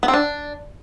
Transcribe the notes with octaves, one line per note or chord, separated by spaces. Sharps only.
B3
C4
D4